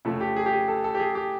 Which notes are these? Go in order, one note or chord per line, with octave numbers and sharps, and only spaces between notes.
F2 C#3 F3 A3 A4
G4
G#4
G4
G#4
A4
A4
G4
G#4
G4